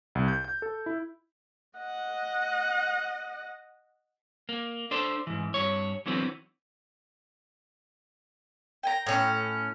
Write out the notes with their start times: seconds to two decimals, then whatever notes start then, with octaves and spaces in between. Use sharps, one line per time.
0.15 C2
0.28 G6
0.44 G6
0.62 A4
0.86 E4
1.79 D#5 F#5
4.49 A#3
4.91 D4 A4 C5
5.27 G#2 E3
5.54 G2 C#5
6.06 D3 E3 F#3 B3 C4
8.83 G5 G#5 A#5
9.06 A2 C#4